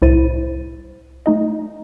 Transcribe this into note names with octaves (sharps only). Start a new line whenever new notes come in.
C2 A2 E4 C5 A6 D#7
A3 D#4 D#5